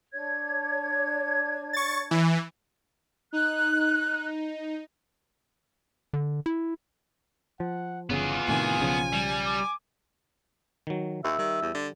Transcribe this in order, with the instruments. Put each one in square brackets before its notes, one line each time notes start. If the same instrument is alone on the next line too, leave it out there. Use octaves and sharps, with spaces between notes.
[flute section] D4 C#5 G#6
[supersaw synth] C#6 A6
E3
[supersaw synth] D#4 [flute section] F#6
[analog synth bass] D3
E4
[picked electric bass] F3 [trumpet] F#5
[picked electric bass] G1 C#3 [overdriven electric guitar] B3 G#4 [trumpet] F4
[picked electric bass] A2 C3 D#3 [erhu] G#5
[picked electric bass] B1 C#3 F3
[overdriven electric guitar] G3
[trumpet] D6
[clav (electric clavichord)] D#3 F#3
[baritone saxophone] D#2 [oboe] E5
[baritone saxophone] D#3 [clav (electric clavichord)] G3
[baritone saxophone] E2
D3